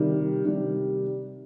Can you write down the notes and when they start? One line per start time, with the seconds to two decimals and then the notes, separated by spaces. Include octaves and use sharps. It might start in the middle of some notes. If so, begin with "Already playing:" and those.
Already playing: C3 D#3 G3
0.44 C3 D#3 G3